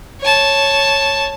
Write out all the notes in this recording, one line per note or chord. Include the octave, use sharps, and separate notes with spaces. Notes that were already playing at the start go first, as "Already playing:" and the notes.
C#5 A5